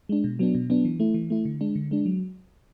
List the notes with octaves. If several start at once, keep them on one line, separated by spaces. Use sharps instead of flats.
G#3 D4
B2
F#3 B3 D4
B2
F#3 B3 D4
E3
A3 E4
E3
A3 E4
D3
G#3 D4
D3
G#3 D4
F#3